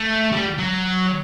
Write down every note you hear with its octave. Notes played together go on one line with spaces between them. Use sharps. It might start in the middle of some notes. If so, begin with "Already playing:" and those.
Already playing: A3
G3
F#3